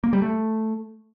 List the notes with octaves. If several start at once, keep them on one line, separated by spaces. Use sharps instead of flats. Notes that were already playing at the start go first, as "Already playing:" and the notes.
A#3
G3
A3